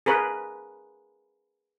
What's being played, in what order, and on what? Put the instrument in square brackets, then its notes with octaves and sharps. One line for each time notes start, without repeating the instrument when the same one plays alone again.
[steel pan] G#4 A#4 B4